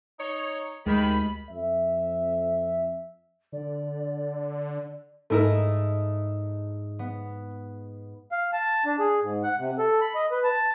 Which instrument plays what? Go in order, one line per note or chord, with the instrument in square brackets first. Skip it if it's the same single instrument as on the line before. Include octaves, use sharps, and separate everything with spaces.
[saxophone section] D#4 C#5
[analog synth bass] D2 [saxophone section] C3 D#3 [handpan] G#3 [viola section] B5
[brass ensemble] F2 E5
[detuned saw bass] D3 [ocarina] D5
[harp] G#2 D#5 [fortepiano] A3 E4 A#4
[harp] B3
[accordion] F5
A5
D4
G#4
G#2
F#5
C3
A4
B5
D#5
B4
A5